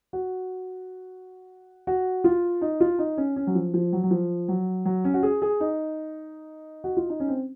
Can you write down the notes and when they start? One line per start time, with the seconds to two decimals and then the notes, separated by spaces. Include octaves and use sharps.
0.13 F#4
1.87 F#4
2.24 F4
2.61 D#4
2.81 F4
2.99 D#4
3.17 C#4
3.36 C#4
3.47 F#3
3.55 F3
3.74 F3
3.93 F#3
4.03 F#3
4.11 F3
4.48 F#3
4.85 F#3
5.04 C#4
5.14 F#4
5.23 G#4
5.42 G#4
5.60 D#4
6.84 F#4
6.97 F4
7.10 D#4
7.20 C#4
7.28 C4